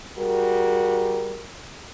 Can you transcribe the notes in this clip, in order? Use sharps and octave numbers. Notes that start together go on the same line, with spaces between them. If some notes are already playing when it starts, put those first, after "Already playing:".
G3 F#4 G#4 A#4